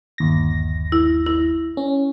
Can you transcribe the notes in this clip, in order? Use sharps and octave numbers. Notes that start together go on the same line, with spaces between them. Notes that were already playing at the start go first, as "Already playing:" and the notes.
G1 D#2 A#6
E4
E4
C#4